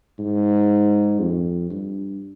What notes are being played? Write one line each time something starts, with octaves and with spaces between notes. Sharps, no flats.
G#2
F2
G2